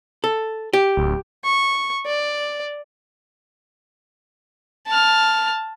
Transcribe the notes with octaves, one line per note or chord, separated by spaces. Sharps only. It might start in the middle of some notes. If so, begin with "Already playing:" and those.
A4
G4
D1
C#6
D5
A5 F6